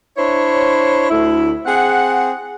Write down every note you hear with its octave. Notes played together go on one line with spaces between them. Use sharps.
D4 E4 C5 C#5
D2 E4
C4 G#4 F#5